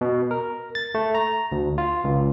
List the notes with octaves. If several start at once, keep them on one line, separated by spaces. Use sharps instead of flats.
B2
A#4
A6
A3
A#5
D2
F4
C#2